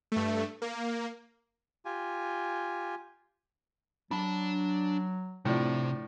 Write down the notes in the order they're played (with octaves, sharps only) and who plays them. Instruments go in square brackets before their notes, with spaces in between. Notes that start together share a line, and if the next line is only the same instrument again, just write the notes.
[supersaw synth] G2 A3
A#3
[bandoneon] F4 G4 G#5
[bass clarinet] F#3 [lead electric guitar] D4 A5 [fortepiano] B5
[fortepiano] A2 F3 D4 [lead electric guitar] C3